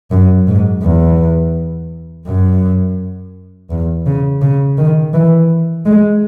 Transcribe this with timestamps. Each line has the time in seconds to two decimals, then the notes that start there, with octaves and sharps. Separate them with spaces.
0.11 F#2
0.47 G#2
0.83 E2
2.26 F#2
3.70 E2
4.06 C#3
4.42 C#3
4.78 D#3
5.13 E3
5.86 G#3